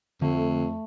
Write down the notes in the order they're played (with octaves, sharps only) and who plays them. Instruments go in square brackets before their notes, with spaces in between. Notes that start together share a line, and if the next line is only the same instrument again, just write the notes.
[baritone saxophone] F2 [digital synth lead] D3 [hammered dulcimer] A3